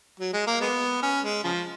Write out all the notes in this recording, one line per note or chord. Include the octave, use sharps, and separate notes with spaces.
F#3
G#3
A#3
G#3 B3
C#4
G#3
C#3 F3